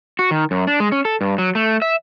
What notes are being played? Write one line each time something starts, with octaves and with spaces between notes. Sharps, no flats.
F#4
D#3
F#2
D4
G#3
C#4
A4
G2
F#3
A3
E5